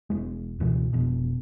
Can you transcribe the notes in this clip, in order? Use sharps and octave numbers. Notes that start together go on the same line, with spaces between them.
E1 G#3
C#2 B2 E3
F1 B2